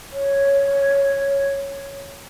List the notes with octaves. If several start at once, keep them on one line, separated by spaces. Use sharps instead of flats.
C#5